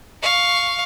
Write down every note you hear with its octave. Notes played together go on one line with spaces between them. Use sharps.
F5 C#6